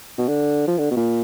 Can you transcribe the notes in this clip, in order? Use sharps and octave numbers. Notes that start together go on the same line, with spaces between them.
B2
D3
F3
D3
B2
A#2